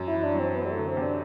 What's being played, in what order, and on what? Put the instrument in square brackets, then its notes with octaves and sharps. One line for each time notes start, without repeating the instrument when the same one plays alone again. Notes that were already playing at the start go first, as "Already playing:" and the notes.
Already playing: [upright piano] F#2
[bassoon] E4
[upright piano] E3
[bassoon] D4
[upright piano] F#3
[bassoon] C4
B3
G3
A3
[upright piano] D3
[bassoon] C4
[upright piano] C3
[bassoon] D4